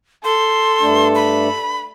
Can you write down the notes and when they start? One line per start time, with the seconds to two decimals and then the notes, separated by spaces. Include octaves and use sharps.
0.24 A4 C6
0.82 G2 A3 D4
1.15 B5